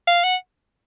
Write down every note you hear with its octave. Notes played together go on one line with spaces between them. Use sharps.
F5
F#5